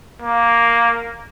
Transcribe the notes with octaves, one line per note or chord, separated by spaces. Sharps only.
A#3